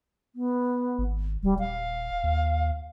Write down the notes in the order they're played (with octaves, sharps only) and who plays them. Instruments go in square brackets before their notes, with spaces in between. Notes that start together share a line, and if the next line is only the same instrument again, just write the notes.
[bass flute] B3
[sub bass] G#1
[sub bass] D#1 [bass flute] G3
[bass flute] F5
[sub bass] D#2